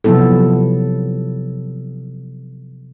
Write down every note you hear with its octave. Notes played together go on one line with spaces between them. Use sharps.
C3 F3 F#3 B3 E4 A4